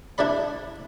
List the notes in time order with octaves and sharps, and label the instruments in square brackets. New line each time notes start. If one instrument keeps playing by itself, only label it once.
[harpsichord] D4 E4 A4 D5 B5